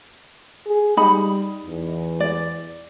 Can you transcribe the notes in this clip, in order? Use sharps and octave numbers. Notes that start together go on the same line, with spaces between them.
G#4
G3 D#4 B5
E2
D5